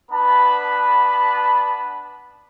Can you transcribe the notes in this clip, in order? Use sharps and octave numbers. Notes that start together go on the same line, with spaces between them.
B3 D4 B4 A5 B5